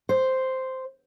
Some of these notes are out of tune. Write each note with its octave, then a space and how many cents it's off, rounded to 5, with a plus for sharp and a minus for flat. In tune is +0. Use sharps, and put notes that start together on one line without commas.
C5 -5